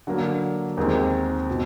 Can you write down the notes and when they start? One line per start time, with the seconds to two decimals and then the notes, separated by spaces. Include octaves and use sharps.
0.07 D3 F#3 A#3
0.77 D#2 D#3 G#3 C4
1.50 B2